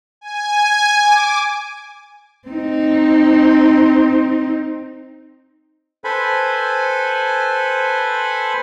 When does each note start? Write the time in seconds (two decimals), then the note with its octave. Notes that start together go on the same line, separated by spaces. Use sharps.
0.21 G#5
1.00 D6
2.48 C4 D#4
6.04 A4 B4 C5 G#5 B5